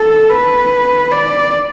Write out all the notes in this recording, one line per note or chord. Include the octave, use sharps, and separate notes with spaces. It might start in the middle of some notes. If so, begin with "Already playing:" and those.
Already playing: A4
B4
D5